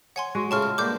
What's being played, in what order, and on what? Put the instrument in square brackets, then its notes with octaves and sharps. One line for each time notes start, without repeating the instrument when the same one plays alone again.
[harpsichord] C#5 [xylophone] F#5 G#5 C6
[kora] G#3 F#4
[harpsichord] A2 C#3 F4 [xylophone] A5 C#6 F6
[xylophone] F6
[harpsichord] G2 D3 A#3 [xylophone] D6 G6